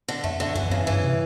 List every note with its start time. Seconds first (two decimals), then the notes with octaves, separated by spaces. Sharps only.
0.08 D3
0.24 F2 A3
0.40 D3
0.55 F#2 E3
0.63 F2
0.70 F#2 C#3
0.87 G2 E3
1.03 C3